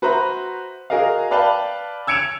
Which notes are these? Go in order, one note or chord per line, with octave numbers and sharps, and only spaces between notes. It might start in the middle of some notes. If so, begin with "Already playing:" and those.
F#4 B4 C5 E5 A#5 B5
F#4 G#4 A#4 D#5 F5
B4 D5 F5 G5 A5 B5
E6 G#6 C#7 D7 E7 F7